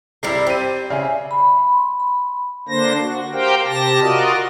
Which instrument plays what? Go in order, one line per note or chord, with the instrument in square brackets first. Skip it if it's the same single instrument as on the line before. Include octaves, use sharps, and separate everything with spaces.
[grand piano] C3 E4 [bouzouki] G3 G4 A#4 [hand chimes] C7
[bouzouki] C4 [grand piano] G4 D#7
[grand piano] C#3 [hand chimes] D5 E5 G#5
[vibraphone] B5
C6
B5
[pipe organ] D3 A#3 D4 C5 A#6
F#4
G4 A#4 C5 F5 G5
C3 G4 A5 A#6
F4 F#4 A#4 D5 D#5